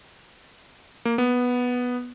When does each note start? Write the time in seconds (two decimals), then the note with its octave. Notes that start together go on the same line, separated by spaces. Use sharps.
1.05 A#3
1.18 B3